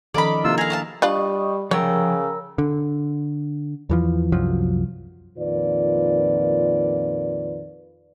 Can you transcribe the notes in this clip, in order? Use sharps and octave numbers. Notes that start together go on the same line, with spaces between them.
D#3 F3 C#4 A4 A#4 D5 D#5 B5
C3 A#3 D4 E4 F4 E6
G#4 F5 G#5 A#5
A3 F5 A5
G3 D4 F4 D5 D#5 C#6 D#6
C#3 F3 A#4 C#5 F#5 G5 A#5 E6
D3
E2 E3 F3
C2 F#2 F3 F#3
F2 A#2 D#3 F4 B4 D5